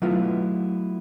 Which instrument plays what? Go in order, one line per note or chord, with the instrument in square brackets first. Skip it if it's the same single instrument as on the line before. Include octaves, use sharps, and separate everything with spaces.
[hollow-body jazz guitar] F#3 A3 B3 E4 F4